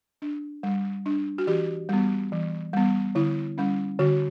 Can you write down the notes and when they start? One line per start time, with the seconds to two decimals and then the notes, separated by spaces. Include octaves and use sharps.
0.22 D4
0.63 G3
1.06 D4
1.38 F#4
1.47 E3 G4
1.89 G3 B3
2.32 E3
2.73 G3 B3
3.15 D3 E4
3.58 G3 C#4
3.99 D3 F#4